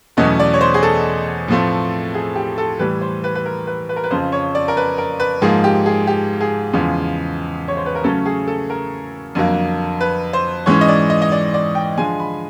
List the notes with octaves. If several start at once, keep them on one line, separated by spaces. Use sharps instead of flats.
E2 B2 F#3 A3 C#4 D#5
D5
C#5
C5
G#4
A4
A2 F3 A3 C4
G#4
G4
A4
A2 E3 G3 B4
C5
B4
B4
A#4
B4
B4
A#4
B4
F2 C#3 F3 C5
C#5
D5
A#4
B4
A#4
B4
G#2 F3 A#3 G#4
G4
G#4
G4
G#4
E2 C#3 F3 G#3
C#5
C5
B4
A#4
C#3 F#3 A3 C#4 A4
G#4
A4
A#4
F2 D3 F#3 A#3
B4
C5
G#2 E3 G#3 C#4 C#5
D#5
D5
D#5
D#5
D5
D5
G5
D3 F3 G#3 G#5
B5